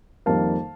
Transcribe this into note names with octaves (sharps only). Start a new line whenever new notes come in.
F2 D#3 G3 A#3 F5 A5